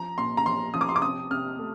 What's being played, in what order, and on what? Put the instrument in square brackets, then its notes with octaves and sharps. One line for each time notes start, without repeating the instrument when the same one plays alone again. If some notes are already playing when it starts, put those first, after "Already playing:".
Already playing: [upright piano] F3 A#5
A#2 C6
A#5
F3 C6
F3 D#6
D6
C6
D6
C3 D#6
C3 F6
A3